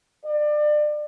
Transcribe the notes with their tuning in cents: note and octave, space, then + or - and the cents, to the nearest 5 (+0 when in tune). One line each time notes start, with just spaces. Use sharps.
D5 +30